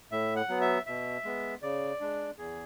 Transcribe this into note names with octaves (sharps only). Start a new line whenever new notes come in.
A2 E5
F#5
F#3 B3
E5
B2 E5
G#3 B3
C#3 D5
G#3 D4
E2 G#4